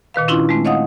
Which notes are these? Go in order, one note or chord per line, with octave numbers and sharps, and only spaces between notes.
A#2 D#3 B4 F5
C#4 D4 E4 F4 C6
G#3 A3 C4
C#5 D#5 F5 F#5 D#6